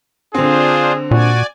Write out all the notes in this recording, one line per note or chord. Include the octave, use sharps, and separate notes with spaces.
D3 C4 D4 F4 G#4 C5
A#2 F#4 D5 G#5